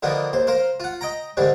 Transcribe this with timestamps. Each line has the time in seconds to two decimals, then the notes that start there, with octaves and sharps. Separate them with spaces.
0.03 D3 D#3 F3 A#3 B3
0.33 D#2 C5
0.47 A#4 C5 F5
0.80 F4 F#5
1.01 D#5 G5 A#5
1.37 G#2 D3 D#3 G3